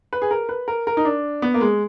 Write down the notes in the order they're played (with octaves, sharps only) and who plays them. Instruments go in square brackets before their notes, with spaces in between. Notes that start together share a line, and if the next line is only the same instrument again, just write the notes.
[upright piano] B4
G#4
A#4
B4
A#4
A#4
D#4
D4
B3
A#3
G#3